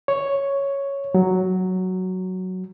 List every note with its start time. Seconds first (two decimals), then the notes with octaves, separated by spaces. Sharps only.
0.08 C#5
1.15 F#3